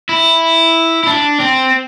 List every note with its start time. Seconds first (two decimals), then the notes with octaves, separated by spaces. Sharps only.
0.09 E4
1.03 E4
1.07 D4
1.40 C4